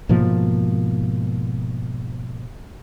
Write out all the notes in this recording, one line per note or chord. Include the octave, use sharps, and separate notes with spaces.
G#2 B2 F3 A#3